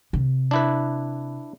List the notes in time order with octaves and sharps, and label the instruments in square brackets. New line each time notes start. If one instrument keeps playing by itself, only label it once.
[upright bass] C3
[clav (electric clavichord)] D4 E4 B4